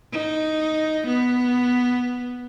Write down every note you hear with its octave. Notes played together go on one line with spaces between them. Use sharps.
D#4
B3